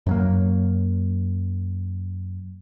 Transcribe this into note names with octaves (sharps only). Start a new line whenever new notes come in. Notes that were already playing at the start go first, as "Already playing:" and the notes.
F#2 F#3 A#3